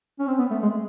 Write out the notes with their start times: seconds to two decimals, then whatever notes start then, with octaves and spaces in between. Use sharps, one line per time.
0.19 C#4
0.27 C4
0.39 B3
0.51 A3
0.62 G#3